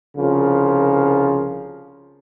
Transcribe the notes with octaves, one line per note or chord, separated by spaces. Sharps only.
C2 C#3 F3 F4 A#4